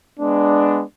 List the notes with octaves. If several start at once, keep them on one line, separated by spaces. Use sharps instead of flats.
G#3 B3 D4